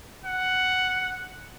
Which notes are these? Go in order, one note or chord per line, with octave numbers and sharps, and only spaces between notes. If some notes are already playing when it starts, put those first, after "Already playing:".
F#5